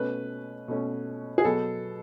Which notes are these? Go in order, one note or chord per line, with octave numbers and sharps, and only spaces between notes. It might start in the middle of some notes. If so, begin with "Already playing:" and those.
Already playing: B2 A3 C#4 B4
B2 A3 C#4
G#4
B2 F#3 B3 A4